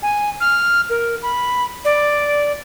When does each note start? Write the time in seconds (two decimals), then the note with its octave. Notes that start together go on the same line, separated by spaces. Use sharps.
0.02 G#5
0.40 F6
0.90 A#4
1.22 B5
1.85 D5